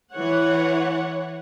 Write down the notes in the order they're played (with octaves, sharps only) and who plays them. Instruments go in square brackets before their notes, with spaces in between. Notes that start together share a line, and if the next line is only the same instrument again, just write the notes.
[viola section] E3 C#5 F#5